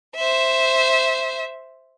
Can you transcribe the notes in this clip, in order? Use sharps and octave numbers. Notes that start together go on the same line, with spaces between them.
C5 E5